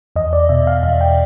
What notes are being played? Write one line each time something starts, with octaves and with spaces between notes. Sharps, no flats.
E2 D#5
D5
B2 E5
F5
E2 F5
G5